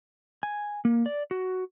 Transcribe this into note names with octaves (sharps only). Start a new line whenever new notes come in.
G#5
A#3
D5
F#4